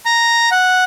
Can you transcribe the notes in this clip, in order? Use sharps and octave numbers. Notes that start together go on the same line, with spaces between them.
A#5
F#5